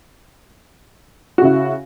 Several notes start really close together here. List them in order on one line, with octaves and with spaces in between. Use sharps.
F#4 C#3 E4